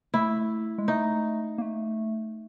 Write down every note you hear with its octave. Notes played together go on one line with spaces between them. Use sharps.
A3 E4
G#3
A3 D#4
A#3
A3